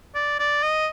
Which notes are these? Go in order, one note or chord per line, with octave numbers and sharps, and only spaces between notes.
D5
D5
D#5